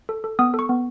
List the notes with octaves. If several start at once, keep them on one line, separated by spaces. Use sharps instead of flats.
A4
A4
B3 D#6
A4 C#6
B3